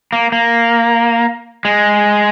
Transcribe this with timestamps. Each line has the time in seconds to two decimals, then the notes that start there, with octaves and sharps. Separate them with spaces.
0.13 A#3
0.32 A#3
1.65 G#3